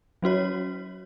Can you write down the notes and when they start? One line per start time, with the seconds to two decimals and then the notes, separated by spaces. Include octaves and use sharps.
0.22 F#3 C#4 F#4 C#5